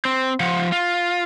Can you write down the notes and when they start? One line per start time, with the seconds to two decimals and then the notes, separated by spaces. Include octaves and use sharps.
0.05 C4
0.40 F3 F#5
0.72 F4